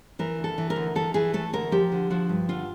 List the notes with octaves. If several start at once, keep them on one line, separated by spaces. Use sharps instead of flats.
E3 A#4
D2
A4
E3
A#4
D2
E3 A4
E3 G#4
A3 A4
D2 A#4
F3 G4
D3
F3 F#4
G2
D3 F4